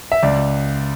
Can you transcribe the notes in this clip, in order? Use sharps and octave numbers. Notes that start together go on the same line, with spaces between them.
E5
C#2 D5